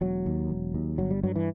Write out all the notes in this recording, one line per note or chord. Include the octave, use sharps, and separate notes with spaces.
E1 F#3
D#2
E1
D#2
G1 F#3
G3
G2 F#3
E3